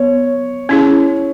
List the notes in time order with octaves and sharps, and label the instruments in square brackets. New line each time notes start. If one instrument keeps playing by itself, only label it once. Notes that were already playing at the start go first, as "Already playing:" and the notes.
Already playing: [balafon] B3 [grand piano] C#5
[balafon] C#4 E4 G#4